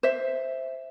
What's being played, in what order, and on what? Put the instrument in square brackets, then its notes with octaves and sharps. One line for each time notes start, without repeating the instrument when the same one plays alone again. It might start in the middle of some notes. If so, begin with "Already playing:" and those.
[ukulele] C5 E5